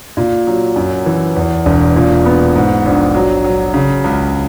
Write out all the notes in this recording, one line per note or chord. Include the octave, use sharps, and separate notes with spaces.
A#2
F#3
F#2
E3
E2
E1
A#2
B3
G#2
A#1
F#3
F#3
C#3
C#2